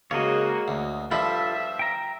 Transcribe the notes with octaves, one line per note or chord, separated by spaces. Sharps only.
C#3 G#3 A#3 F#4 C#5 D#5
D2
G2 F3 E4 F4 A4 E5 B5
G5 A#5